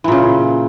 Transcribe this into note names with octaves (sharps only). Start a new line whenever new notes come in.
A#2 C#3 E3